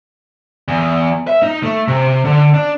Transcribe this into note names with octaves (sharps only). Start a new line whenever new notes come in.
E2
E5
D#4
A3
C3
D3
D4